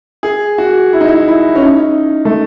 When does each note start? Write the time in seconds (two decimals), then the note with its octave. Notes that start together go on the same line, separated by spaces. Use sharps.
0.23 G#4
0.58 F#4
0.93 E4
1.01 D#4
1.08 E4
1.28 E4
1.55 C#4
1.63 D#4
2.25 A3